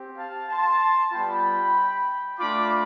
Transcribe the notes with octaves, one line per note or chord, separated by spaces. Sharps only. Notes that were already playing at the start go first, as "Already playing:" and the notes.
Already playing: C4 G4
F5 A5
A5 C6
G3 B3 F4 G5 B5
A3 D4 F4 B5 D6